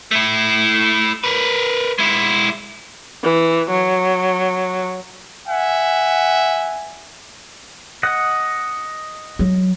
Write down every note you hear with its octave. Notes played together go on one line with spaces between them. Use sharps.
A3 E4
A#4 B4
G#3 E4
E3
F#3
E5 F#5 G#5
D#5 F#5
F#3